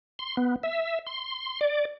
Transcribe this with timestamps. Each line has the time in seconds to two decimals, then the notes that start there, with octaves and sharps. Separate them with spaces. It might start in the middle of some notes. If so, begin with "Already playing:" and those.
0.19 C6
0.37 B3
0.63 E5
1.07 C6
1.61 D5